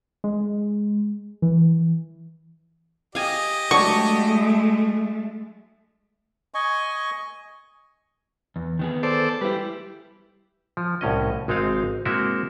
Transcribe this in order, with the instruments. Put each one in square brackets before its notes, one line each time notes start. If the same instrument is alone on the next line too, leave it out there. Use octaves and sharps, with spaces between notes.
[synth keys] G#3
E3
[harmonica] G4 D#5 [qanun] F5 G#5
[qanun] F#3 D4 [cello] G#3 A3 [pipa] C#6
[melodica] D#5 G#5 C#6
[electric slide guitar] E2
D#3 B3 G#4
[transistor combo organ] A4 C5 D5
[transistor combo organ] G3 [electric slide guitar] E4 B4
[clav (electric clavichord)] F3
C2 A2 C#4 D#5
G#1 G#3 C4 D#4 F5
G#3 A#3 C4 E4 F#4 E5